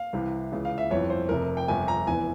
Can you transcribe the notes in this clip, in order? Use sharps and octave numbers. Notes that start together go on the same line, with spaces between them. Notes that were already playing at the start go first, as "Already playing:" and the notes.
Already playing: F5
C2 C3 E3
C#2 C#3 E3
F5
E5
G1 F2 E3 C#5
C5
F1 F2 C3 A#4
G5
G1 F2 C3 G#5
A#5
F1 E2 E3 G#5